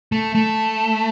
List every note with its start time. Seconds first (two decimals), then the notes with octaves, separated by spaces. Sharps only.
0.12 A3
0.35 A3